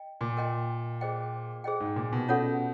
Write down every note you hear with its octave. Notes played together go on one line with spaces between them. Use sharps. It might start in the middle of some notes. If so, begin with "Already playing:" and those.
Already playing: D#5 G5
A#2
A#4 D#5 G5 C6
G#4 C5 D#5 G5
G#4 C5 D#5 G5
G#2
A#2
B2
C#4 F4 A4 C#5 F#5